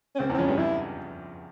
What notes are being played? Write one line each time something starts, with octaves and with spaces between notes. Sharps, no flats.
C#4
C#2 C#3 C4
E2 E3 C4
F2 F3 C#4
G2 G3
F2 F3 E4